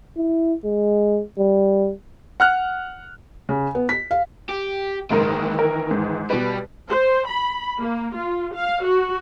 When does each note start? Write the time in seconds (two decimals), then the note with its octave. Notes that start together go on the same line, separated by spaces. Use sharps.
0.17 E4
0.64 G#3
1.38 G3
2.40 F#5 F6 F#6
3.49 C#3
3.75 B3
3.89 B6
4.11 F5
4.49 G4
5.10 F#1 G#2 D#3 E3 A#4
5.59 A#4
5.91 G#2
6.30 B2 G3 B4
6.90 C5
7.28 B5
7.79 A#3
8.15 F4
8.55 F5
8.84 F#4